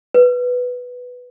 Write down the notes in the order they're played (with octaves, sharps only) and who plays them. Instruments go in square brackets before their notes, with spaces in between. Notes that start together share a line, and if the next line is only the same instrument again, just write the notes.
[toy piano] B4